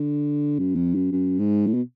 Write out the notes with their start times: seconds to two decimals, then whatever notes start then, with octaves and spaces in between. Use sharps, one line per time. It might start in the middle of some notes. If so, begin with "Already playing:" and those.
Already playing: D3
0.59 F#2
0.76 F2
0.95 F#2
1.12 F#2
1.39 G#2
1.67 A2
1.74 B2